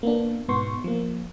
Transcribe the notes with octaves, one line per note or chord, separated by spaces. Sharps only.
A#3 B3 D4
G#2 B2 B3 C6 C#6
F3 A#3